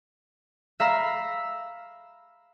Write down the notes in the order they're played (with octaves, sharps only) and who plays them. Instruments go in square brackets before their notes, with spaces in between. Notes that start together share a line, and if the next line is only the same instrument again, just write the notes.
[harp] E5 F5 A#5 B5 E6